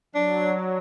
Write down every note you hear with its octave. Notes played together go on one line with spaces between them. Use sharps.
F#3 D4